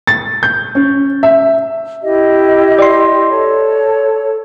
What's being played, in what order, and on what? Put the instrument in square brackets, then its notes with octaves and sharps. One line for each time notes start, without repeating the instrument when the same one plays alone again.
[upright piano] A6
G6
C#4
E5
[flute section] E4 G4 D#5
[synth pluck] D5 C6
[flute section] A4 C#5